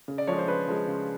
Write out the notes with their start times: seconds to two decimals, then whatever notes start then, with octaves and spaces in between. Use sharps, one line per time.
0.08 C#3
0.18 D5
0.27 F3 G#3 C#5
0.38 C5
0.48 C#3 B4
0.68 F3 G#3
0.87 C#3